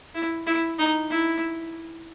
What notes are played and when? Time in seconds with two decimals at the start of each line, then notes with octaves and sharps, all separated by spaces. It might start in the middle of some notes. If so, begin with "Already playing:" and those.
0.15 E4
0.47 E4
0.79 D#4
1.11 E4